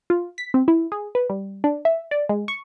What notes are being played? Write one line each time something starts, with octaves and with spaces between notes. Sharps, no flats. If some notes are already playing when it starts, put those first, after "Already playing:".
F4
B6
C4
E4
G#4
B4
G3
D4
E5
D5
G#3
C#6